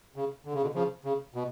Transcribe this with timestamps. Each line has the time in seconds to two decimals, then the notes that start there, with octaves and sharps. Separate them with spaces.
0.16 C#3
0.45 D3
0.54 C#3
0.62 B2 D3
0.74 C#3 F3
1.04 C#3
1.34 B2